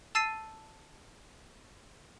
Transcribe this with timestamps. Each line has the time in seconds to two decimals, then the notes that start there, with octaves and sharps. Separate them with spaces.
0.15 A5 E6 A6 C7 D#7 E7